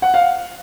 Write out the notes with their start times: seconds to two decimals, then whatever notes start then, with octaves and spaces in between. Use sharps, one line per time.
0.02 F#5
0.14 F5